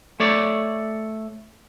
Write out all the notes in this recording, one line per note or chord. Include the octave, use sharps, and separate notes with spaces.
A3 C#5 D5